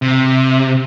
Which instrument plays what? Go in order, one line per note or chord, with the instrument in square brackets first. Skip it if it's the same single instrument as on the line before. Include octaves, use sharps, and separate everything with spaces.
[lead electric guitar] C3